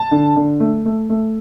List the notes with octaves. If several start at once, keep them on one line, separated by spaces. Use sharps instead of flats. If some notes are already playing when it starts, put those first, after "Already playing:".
Already playing: A5
D3
D3
A3
A3
A3